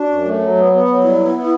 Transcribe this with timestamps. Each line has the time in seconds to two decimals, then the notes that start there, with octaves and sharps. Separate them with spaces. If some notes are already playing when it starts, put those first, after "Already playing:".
Already playing: D4 F#4
0.09 F#2
0.25 A3
0.41 F#3
0.57 B3
0.73 B3
0.88 F#3
1.03 G3 E4
1.19 B3
1.35 B3